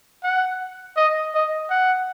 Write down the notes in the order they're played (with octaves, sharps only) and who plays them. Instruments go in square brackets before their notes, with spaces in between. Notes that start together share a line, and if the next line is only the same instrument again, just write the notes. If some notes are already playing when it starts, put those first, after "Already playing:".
[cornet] F#5
D#5
D#5
F#5